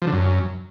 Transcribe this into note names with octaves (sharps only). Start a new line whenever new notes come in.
F3
D3
F#2